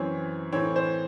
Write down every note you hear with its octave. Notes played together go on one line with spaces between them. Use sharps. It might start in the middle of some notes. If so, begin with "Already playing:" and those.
Already playing: F#2 E3 C4 C#5
A2 E3 C4 C#5
C5